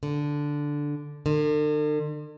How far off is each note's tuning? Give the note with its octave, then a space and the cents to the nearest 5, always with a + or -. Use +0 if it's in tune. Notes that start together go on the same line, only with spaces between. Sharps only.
D3 -5
D3 +45